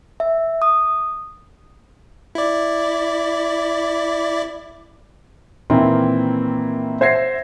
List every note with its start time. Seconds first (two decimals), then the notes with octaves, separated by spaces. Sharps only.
0.20 E5
0.62 D#6
2.35 E4 D5
5.70 A#2 D#3 E3 A#3 C4 E4
7.01 C5 E5 F#5 G#6 A#6 C7